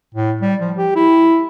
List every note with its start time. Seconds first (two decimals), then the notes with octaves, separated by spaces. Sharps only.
0.15 A2
0.42 G3
0.61 F3
0.78 G4
0.96 E4